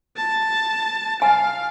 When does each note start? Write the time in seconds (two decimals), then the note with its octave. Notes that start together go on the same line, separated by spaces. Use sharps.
0.17 A5
1.22 F5 G#5